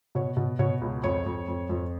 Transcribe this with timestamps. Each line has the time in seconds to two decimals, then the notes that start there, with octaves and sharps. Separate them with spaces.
0.15 B2 C#5
0.37 B2
0.59 B2 C#5
0.81 C#2
1.04 F2 C#5
1.26 F2
1.48 F2
1.69 F2